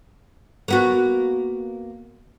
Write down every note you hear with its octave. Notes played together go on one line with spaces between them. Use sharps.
A#3 B3 F#4